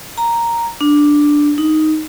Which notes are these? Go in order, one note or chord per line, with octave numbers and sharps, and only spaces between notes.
A#5
D4
D#4